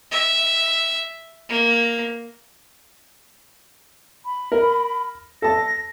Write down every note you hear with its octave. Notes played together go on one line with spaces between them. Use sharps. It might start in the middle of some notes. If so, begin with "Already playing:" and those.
E5
A#3
B5
A#4
A4 A5 A#6